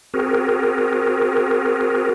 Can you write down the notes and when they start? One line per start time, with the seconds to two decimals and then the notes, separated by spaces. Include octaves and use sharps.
0.14 C4 F#4 G#4 A#4